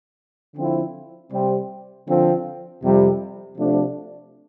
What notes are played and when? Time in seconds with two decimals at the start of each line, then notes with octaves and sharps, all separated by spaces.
0.55 D3 F3 C4 E4
1.31 C3 G3 C4
2.07 D3 F3 C4
2.82 F2 C3 G3
3.58 C3 F3 A3 D4